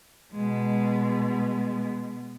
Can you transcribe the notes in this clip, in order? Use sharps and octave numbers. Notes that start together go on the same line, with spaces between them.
B2 G#3